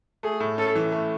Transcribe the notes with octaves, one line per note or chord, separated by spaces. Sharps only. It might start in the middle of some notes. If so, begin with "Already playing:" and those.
A3 G#4
A2
C#4 A4
E3
A3